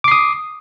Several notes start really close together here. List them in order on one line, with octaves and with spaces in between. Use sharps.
D6 C7 D#6